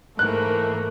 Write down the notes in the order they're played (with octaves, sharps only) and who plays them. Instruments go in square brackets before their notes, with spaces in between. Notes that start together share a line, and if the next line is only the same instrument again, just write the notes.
[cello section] G#2 E3 A#4 [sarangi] A3 [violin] A#3 [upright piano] F#6